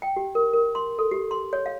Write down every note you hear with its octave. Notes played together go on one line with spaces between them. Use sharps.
G5
G4
A#4
A#4
C6
A4
G4
C6
C#5
F5